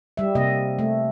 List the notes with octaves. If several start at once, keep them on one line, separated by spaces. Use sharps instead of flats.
G3 E5
C3 A#3 D#5
A3